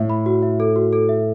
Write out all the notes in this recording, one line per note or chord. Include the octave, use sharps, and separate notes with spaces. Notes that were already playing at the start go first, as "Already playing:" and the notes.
Already playing: A2 E5
B5
F#4
E5
A4
F#4
A4
E5